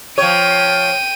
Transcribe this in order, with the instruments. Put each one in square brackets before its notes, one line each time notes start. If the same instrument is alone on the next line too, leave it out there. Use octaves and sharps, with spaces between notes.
[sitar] F3 C#5 [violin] G5 D#7